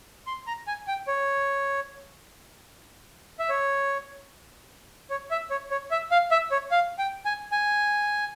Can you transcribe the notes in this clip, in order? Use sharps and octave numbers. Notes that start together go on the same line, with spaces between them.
C6
A#5
G#5
G5
C#5
E5
C#5
C#5
E5
C#5
C#5
E5
F5
E5
C#5
F5
G5
G#5
G#5